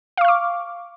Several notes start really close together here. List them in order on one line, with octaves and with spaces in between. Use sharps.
F5 C#6 F6 D6